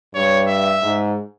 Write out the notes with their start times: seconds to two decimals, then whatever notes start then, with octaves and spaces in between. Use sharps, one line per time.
0.15 G2 C#5
0.48 E5
0.83 G#2